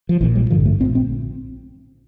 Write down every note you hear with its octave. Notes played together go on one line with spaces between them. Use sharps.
F3
A#1 A#2 E3
G3
A1 G2 D3 F3
A3
A#1 A#2 C4
C4